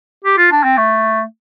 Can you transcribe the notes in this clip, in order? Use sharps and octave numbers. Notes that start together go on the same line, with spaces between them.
G4
F4
D4
C4
A3